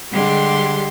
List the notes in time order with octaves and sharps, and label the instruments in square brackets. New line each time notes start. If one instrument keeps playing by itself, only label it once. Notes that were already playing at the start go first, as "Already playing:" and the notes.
[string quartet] D3 G3 G#3 G4 C6